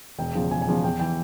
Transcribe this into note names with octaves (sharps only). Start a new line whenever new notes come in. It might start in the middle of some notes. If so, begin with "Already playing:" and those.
E1 G5
E2 C#3 F3
E1 G#5
G#5
E2 C#3 F3
E2 G5
E3 G5